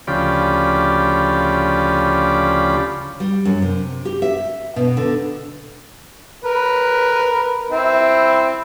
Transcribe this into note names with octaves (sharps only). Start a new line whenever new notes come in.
D2 C#3 F3 G4 D5 B5
G3
F#2
C3
G4
E5
B2
D3
A#4 B4
C4 E4